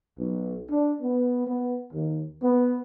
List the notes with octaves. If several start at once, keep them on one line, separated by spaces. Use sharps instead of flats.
B1
D4
B3
B3
D#2
B3